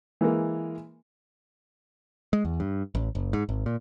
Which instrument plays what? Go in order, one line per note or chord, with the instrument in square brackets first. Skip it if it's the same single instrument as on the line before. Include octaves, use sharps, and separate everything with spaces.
[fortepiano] E3 G#3 A#3
[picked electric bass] G#3
E2
G2
A1
F#1
G#2
G#1
A#2